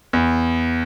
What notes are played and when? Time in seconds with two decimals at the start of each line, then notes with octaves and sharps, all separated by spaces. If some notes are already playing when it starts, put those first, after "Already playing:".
0.13 E2